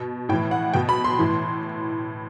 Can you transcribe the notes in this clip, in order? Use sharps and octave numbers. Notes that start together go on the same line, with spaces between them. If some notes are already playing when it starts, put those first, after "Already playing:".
Already playing: B2
A2 E3 G5
F#5
B2 G5
B5
C6
A2 E3